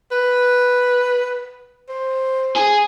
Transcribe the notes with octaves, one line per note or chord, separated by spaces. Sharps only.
B4
C5
G#4